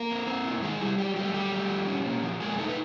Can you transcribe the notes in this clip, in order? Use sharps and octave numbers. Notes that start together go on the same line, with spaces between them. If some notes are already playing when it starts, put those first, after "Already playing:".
Already playing: A#3 A#4
C4
C4
E4
D#3 G#3 G#4
G3 E4 G4
F#3 G3 G4
G3 A3 G4
F#3 G3 G4
A3
F3
C#4
A#3
F3
G#3 A#3 G#4
A3 D#4 A4
B4